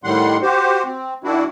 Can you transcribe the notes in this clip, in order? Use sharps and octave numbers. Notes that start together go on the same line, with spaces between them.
A2 D#3 G3 F#5 C6
F#4 G4 C5
C4
D#3 D4 E4 F#4